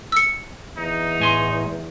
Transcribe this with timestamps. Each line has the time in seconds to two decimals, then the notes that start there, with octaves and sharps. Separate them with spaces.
0.12 E6 C#7
0.77 E2 D#4
1.20 A2 G#5 C6